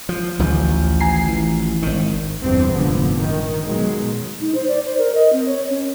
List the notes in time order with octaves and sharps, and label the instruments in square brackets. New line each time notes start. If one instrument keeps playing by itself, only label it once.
[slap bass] F3
[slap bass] A1 D#3 F3 [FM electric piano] D2
[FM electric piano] G#5 A#5 C7
E3
[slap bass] G#1 D#3
[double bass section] G1 E2 C3 C4
F1 G#2 D3 F3 B3
D#3
B2 F#3 G#3
[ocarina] D#4
C5
D5
C5
A#4
D#5
C4
C#5
C#4